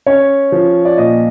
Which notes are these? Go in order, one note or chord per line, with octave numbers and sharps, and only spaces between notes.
C#4 C#5
F3
D5
A#2 D#5